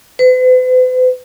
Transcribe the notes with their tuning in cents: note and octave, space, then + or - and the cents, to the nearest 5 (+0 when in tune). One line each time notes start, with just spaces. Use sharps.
B4 +45